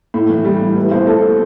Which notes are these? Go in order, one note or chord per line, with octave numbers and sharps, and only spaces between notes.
A2
E3
G3
A2
E4 B4
B2 C5
A3 A4